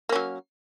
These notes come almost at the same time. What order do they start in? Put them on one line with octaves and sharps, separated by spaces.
A#3 C#4 F#3